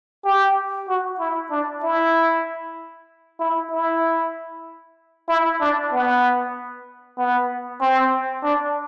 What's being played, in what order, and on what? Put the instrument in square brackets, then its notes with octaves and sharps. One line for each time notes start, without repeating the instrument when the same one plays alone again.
[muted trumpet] G4
F#4
E4
D4
E4
E4
E4
E4
D4
B3
B3
C4
D4